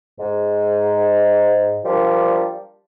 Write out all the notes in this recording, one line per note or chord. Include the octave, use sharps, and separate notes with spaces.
G#2
F3 G3 A#3 D4